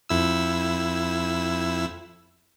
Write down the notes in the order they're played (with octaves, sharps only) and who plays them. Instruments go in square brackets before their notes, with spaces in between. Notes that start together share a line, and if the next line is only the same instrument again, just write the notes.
[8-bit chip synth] F2 E4 E6